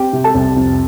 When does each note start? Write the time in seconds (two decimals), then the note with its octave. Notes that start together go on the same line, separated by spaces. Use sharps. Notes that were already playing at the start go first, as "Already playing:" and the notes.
Already playing: C4 G4 G5
0.13 C3
0.24 A4 A5
0.35 C2
0.56 F2